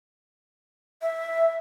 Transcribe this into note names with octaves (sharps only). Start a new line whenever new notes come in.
E5